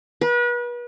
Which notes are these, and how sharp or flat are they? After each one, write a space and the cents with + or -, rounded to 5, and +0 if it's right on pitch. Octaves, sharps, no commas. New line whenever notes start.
B4 -35